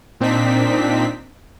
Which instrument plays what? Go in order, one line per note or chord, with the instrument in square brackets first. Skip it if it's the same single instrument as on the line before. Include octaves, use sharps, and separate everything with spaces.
[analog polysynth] A#2 C4 D4 D#4 B6